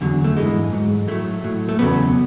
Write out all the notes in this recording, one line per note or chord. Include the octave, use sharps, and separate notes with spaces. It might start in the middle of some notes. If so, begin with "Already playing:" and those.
E2 D3 F#3
A3
G#2 E3 G#3
G#2 F#3
A2 F#3 A3
A2 F#3
A3
E2 C#3 F#3 B3